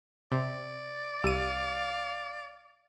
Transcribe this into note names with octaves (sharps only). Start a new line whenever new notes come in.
C3 D5
C2 G4 F5 D#7